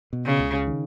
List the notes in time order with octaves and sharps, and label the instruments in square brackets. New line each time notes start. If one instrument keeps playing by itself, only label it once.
[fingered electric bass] B2
[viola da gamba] C#3
[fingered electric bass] C#2
D#3